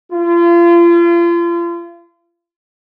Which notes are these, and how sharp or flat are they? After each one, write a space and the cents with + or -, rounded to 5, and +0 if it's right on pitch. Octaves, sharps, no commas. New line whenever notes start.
F4 -35